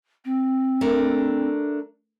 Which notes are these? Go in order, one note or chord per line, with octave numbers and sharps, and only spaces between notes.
C4
A3 D4 A#4